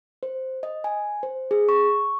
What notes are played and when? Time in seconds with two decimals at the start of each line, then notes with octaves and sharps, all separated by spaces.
0.23 C5
0.63 D#5
0.84 G#5
1.23 C5
1.51 G#4
1.69 C#6